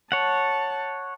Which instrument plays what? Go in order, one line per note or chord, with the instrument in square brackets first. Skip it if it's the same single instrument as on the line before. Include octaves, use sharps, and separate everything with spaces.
[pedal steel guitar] C#5 F#5 [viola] A5